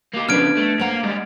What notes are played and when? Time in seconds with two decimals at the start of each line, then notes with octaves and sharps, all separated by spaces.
0.13 A#3 G4
0.29 C#3 F3 B3 D4 B4 F6 G#6 D7
0.57 A3
0.79 A#3 C5 F#5 A#5
1.03 G3 G#3